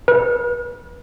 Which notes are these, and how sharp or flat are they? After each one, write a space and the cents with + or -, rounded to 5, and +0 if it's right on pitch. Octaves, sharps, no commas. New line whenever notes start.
B4 -35